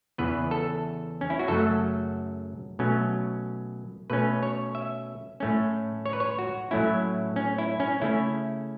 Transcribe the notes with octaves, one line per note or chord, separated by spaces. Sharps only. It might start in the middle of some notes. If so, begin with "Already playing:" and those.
E2 C#3 E3 B3 B4
A4
C#4
E4
F#4
F#2 C#3 F#3 A3 A4
B2 F#3 A3 C#4
B2 A3 C#4 B4
C#5
E5
A2 A3 C#4
C#5
B4
C#5
F#4
A2 F#3 A3 C#4 E4
C#4
E4
C#4
C#3 A3 C#4 E4